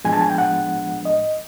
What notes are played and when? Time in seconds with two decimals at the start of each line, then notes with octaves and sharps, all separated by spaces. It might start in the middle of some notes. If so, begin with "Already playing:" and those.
0.05 A2 F3 G#3 B3 D4 G#5
0.13 A5
0.21 G#5
0.30 G5
0.38 F#5
1.05 D#5